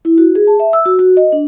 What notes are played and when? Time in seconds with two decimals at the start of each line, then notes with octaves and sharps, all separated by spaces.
0.05 E4
0.18 F#4
0.35 G#4
0.47 A5
0.60 E5
0.73 E6
0.86 F#4
0.99 F#4
1.17 D#5
1.32 D4